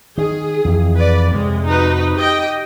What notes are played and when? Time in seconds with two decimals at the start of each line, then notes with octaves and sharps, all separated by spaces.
0.18 D#3 G#4
0.65 F2 E3
0.97 B4 D5
1.32 F2 C3 G#3
1.67 D#4 F#4 B4
2.15 G4 D#5 G5